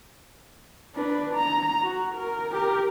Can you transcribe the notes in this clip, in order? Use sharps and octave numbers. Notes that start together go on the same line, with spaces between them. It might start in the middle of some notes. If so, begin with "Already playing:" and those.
D4 B4
A#5
F#4
A#4
G4 A#4